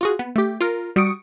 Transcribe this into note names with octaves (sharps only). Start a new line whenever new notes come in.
F4 F#4 G#4
B3
A3 G4
F4 A#4
G3 F#4 C#6 D#6 C#7 D7